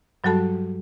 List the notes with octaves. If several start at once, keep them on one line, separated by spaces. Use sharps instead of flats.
G2 F#3 G3 F#4 A4 A5